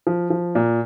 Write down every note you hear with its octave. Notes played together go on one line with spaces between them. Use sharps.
F3
F3
A#2